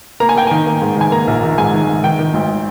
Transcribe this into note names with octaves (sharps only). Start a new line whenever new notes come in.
A#3 A#5
G#5
A#3 G5
D#3 G#5
A#3
G#2
D#3 G#5
A#3 A#5
A#1
D#3
G#2 G#5
D#3
G#2
D#3 G5
D#3
G#1